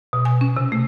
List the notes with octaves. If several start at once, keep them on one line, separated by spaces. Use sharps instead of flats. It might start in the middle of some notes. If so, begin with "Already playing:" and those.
B2
G#5
C#4
C3
A3